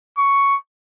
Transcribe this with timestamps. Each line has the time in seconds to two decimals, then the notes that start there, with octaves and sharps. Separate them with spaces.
0.18 C#6